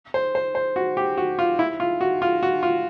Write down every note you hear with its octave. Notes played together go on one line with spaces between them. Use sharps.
C5
C5
C5
F#4
G4
F#4
F4
E4
F4
F#4
F4
F#4
F4